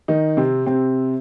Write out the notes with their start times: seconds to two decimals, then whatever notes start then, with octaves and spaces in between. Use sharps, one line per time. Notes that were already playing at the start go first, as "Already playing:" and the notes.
0.08 D#3 D#4
0.37 C3 C4
0.66 C3 C4